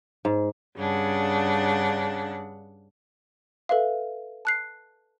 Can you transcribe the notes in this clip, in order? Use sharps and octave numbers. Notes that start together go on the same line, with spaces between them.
G#2
G2 C#3 D4 F#5
A4 B4 E5 F5
A5 F#6 C7